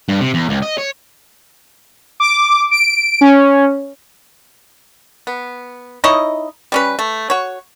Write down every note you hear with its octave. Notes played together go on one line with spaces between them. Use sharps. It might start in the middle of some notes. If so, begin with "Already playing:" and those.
G2
C3
E2
C#2
D#5
C#5
D6
D7
C#4
B3
D#4 E4 C#5 D#5
G3 C#4 B4
A3
F#4 C#5